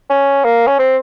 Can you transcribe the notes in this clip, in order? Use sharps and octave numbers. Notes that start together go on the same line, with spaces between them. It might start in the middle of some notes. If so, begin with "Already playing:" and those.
C#4
A#3
C#4
C4